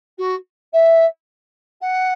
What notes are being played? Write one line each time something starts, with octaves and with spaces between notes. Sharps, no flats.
F#4
E5
F#5